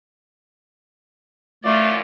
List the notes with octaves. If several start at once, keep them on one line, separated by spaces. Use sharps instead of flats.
F#2 E3 A3 F4 D5